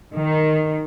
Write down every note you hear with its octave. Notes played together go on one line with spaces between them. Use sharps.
D#3